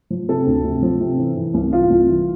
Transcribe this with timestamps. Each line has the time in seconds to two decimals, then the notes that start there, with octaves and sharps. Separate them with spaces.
0.10 F3
0.29 C3 A4
0.47 D2
0.64 C3
0.82 F3
1.00 C3
1.18 E3
1.37 E3
1.54 C2
1.72 E3 F4
1.90 C2
2.08 E3